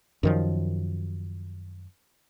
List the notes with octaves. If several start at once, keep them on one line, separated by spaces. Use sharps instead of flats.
F#2 D#3 F3